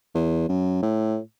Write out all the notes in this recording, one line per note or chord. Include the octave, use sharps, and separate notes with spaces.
E2
F#2
A2